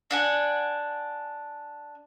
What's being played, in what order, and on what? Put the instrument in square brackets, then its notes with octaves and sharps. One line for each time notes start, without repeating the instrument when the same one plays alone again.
[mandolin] D4 F#5 G#5